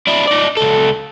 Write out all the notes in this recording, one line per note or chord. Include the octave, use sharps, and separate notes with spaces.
D4 E4
D#4 D5
C#2 A4